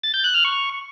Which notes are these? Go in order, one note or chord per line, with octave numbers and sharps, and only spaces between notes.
A6
G6
F#6
F6
C#6